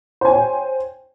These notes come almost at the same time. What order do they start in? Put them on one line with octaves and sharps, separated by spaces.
C5 G#5 C#5 G5